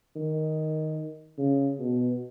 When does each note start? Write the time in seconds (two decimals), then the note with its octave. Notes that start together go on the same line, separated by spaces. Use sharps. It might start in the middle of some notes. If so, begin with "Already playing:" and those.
0.15 D#3
1.38 C#3
1.79 B2